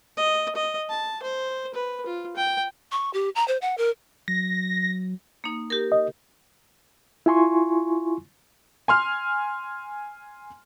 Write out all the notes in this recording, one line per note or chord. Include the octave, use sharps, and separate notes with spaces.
D#5
D#5
A5
C5
B4
F4
G5
C#6
G4
A#5
C5
F#5
A#4
F#3 A#6
A#3 D#4
G4 A#4
D#5
E4 F4 G#5 C6 C#6
G#5 C6 F6